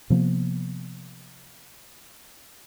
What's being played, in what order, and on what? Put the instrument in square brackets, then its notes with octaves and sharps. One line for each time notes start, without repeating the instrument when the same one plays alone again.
[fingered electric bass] C3 F3 A#3 B3